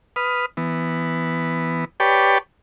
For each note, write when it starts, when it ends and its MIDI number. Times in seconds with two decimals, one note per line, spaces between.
0.16 0.46 71
0.16 0.46 87
0.16 0.46 89
0.57 1.85 52
0.57 1.85 59
2.00 2.38 67
2.00 2.38 71
2.00 2.38 73
2.00 2.38 74
2.00 2.38 79
2.00 2.38 81